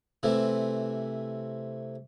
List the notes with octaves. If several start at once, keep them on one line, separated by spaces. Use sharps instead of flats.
C3 E3 A3